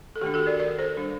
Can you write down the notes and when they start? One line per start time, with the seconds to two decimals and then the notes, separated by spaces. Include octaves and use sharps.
0.16 A4
0.21 D#3 A3 D4 G4
0.34 F#4 A4
0.46 A#4 D5
0.59 A#4 D5
0.79 A4 C5
0.97 G3 D4